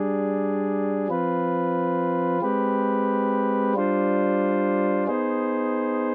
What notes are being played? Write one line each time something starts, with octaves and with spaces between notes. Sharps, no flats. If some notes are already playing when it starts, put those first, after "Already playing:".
Already playing: G3 D4 G#4
F3 C4 F4 B4
G#3 C4 G4 B4
G3 D4 F4 C5
B3 D#4 G#4 C5